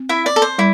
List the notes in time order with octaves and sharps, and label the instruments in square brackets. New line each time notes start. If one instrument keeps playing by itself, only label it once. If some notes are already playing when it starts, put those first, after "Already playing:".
Already playing: [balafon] C4
[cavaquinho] E4 E5
D5
A4
C5
[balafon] G3 [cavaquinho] E4